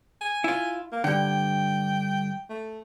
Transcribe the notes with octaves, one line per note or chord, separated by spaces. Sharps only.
G#5
E4 F4
A#3
G2 D3 G5
A3